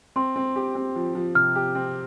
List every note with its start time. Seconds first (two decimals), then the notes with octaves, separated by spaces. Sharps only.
0.16 C4 C6
0.36 C4
0.56 G4
0.75 C4
0.96 F3
1.15 F3
1.35 C3 F6
1.55 G4
1.75 C4